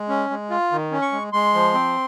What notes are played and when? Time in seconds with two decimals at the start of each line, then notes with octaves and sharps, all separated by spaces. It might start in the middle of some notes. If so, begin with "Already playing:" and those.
Already playing: G#3
0.09 C#4
0.30 G#3
0.50 F4
0.72 D#3
0.92 C#4
1.02 C#6
1.12 G#3
1.33 G#3 C6
1.54 F3
1.74 C4